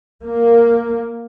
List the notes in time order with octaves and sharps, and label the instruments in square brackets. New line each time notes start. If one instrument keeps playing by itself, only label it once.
[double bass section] A#3